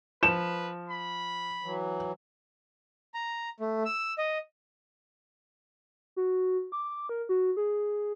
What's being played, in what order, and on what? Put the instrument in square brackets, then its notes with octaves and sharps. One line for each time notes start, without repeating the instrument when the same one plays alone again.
[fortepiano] F3 [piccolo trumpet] B4 [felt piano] E7
[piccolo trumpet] B5
[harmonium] E3 F#3
[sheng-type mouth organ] A#5
A3
E6
D#5
[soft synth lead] F#4
D6
A#4
F#4
G#4